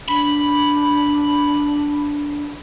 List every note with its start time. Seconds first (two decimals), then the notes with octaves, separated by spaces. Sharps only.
0.08 D4 B5